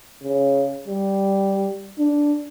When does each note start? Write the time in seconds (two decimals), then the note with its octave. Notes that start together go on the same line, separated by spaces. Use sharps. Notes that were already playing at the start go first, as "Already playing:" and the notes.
0.23 C#3
0.88 G3
1.99 D4